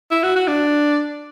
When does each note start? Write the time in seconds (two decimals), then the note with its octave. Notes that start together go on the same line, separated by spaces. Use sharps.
0.11 E4
0.23 F#4
0.36 F#4
0.47 D4